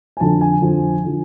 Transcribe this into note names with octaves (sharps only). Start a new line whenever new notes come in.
G#5
F2 D3 F3 A5
G#5
F2 D3 F3
D3 F3